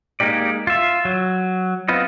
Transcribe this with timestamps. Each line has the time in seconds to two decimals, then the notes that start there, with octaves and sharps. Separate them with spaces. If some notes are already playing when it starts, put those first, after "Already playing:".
0.20 G#3 A#3 D#4 G4 D5
0.67 F4 E5
1.05 F#3
1.88 B3 C4 F4 B4 D#5